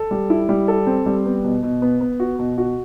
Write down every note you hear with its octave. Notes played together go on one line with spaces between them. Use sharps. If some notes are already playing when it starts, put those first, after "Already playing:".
Already playing: A4
G3
E4
G3
A4
C4
G3
B3
B2
B2
B3
B3
F#4
B2
F#4